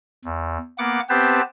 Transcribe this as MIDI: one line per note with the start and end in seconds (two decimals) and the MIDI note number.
0.25 0.58 40
0.78 1.00 58
0.78 1.00 59
0.78 1.00 78
0.78 1.00 86
1.09 1.41 59
1.09 1.41 60
1.09 1.41 67
1.09 1.41 71
1.09 1.41 72
1.09 1.41 81